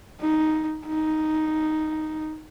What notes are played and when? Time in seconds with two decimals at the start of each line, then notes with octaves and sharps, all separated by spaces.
0.21 D#4
0.87 D#4